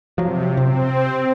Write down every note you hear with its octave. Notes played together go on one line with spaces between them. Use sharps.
C3 F3 F#3
C3 C4